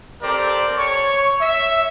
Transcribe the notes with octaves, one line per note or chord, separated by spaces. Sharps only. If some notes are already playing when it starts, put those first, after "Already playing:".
C4 G4 A4 A#4 C5 D5
C#5 C#6
E5